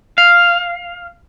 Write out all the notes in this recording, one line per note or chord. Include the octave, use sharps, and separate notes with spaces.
F5